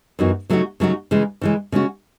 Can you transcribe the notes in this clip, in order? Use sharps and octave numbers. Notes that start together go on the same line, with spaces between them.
F#2 E3 B3 D#4 F#4
C#3 F#3 A3 D#4 F#4
C#3 F#3 A3 D#4 F#4
C#3 E3 G#3
C#3 E3 G#3
C#3 G#3 C#4 F#4